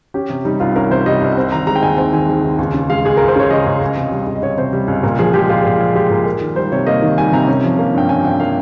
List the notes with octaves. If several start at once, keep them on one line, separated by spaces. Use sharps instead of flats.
C#4 G4
C3
G3 D#4
C2 F4
C#4 A#4
C3 C5
G3 D#5
C2
C4
D#3 A#5
G#3 A#5
G5
D#2 G#5
C4 G5
D#3 G#5
G#3
D#2
C#2
C#3
G#3 F5
C#2 G#4
C#2 A#4
C5
C#3 C#5
G#3 D#5
C#2
C#2
C3
G3
C#2
D#5
C#2 C#5
C3 C5
G3
C#2
A#2 A#4
F3 G#4
G#3 G4
A#2 F4
A#2
F3
G#3 G4
A#2 A#4
A#3
D#3
G3 C5
C3 C#5
A#3 D#5
D#3
G3 G#5
C3 A#5
C#4
F3
A#3
G2 G5
C#4 G#5
F3 G5
A#3 F5